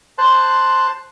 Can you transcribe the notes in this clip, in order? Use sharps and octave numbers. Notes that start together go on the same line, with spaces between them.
C5 A5 C6 F#6